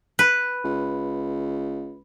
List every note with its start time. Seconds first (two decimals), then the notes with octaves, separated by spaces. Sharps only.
0.19 B4
0.64 C#2